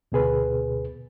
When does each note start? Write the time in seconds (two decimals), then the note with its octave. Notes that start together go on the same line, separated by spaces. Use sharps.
0.12 D2 B2 G#4 B4